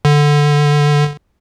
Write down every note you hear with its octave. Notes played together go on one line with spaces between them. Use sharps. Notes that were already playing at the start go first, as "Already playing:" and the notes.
D3